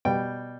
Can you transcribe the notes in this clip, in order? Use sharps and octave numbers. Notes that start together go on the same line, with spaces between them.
B2 G3 G5